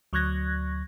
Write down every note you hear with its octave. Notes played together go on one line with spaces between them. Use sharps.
D2 F#3 C#6 F#6 G#6 A#6